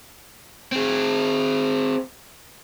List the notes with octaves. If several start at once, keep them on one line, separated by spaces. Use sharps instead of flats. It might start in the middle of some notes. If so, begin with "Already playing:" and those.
C4 G#4